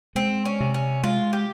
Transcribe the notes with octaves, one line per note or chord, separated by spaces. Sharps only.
G#3 C4
C#4
C3
C#4
G#3 F4
G4